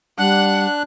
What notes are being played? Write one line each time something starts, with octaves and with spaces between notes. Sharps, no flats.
G3 D4 F#5 F#6